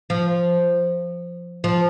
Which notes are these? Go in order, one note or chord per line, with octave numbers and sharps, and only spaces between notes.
F3
F3